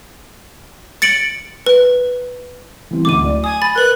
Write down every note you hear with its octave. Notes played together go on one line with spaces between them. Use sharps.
A6 C#7 D7 F#7
B4
E3 G3 C4
D1 D2 G#2 D6 D#7
D5
G#5 D#6
B5 A6
A#4 B4 F#6